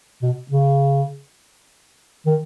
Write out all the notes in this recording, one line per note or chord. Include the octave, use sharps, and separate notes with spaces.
B2
C#3
D#3